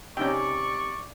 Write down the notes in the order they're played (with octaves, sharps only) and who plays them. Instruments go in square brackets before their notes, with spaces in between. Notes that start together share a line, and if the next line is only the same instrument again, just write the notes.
[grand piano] C3 E6 [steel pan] C#4 D#4 G5 [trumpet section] D5 C#6